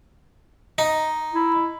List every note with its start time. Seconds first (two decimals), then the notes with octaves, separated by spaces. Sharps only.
0.78 D#4
1.34 E4